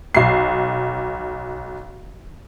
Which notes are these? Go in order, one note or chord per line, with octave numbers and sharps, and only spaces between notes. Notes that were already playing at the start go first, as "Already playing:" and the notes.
B1 C7